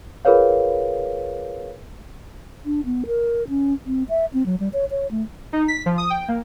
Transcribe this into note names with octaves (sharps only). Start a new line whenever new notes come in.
F4 G#4 A#4 B4 C#5 F5
D4
B3
A#4
C#4
C4
E5
C4
F#3
G3
C#5
C#5
A3
D#4
B6
F3
D#6
G5
A#3